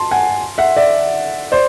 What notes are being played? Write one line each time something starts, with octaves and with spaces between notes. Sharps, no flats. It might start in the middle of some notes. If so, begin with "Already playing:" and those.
Already playing: A5 C6
F#5 G#5
E5 F#5
D5 E5
C5 D5